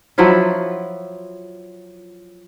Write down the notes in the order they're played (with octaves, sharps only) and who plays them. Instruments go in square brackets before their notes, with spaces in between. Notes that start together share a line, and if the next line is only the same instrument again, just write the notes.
[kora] F3 F#3 E4 F4